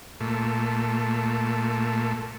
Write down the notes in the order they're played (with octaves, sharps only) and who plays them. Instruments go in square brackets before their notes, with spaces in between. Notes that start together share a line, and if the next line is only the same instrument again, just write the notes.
[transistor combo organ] A#2 A3